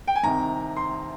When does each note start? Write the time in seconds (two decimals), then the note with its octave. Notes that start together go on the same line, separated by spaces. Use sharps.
0.07 G5
0.15 G#5
0.23 C2 C3 D#3 A#5
0.76 C6